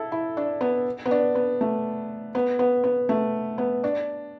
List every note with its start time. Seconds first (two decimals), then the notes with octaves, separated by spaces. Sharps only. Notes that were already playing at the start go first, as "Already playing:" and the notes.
Already playing: E4 A4
0.12 E4
0.37 D4
0.61 B3
1.06 B3
1.11 D4
1.35 B3
1.61 A3
2.35 B3
2.59 B3
2.84 B3
3.09 A3
3.58 B3
3.84 D4